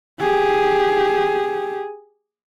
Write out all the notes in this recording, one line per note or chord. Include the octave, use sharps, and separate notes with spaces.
G4 G#4